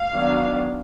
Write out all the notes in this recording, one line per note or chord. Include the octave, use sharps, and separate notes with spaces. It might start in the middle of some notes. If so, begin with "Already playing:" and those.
Already playing: F5
D#3 F#3 B3 D4